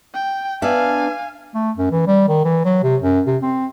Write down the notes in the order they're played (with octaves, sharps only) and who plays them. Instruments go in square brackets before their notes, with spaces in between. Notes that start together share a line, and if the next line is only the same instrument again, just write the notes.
[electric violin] G5
[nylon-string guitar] B3 D4 E5 [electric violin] F5 G#5
[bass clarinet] A3
F#2
E3
G3
D#3
E3
F#3
C3
F#2
C3
C4